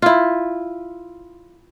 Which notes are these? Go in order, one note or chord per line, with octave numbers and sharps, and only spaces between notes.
E4 F4